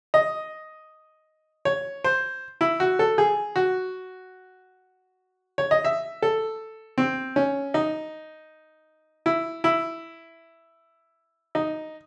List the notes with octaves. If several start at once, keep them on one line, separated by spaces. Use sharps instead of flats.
D#5
C#5
C5
E4
F#4
A4
G#4
F#4
C#5
D#5
E5
A4
C4
C#4
D#4
E4
E4
D#4